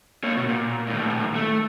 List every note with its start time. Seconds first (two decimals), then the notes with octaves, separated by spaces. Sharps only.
0.24 A#3 C#5
0.37 B2
0.49 A#2
0.87 D#2 A2
1.35 A3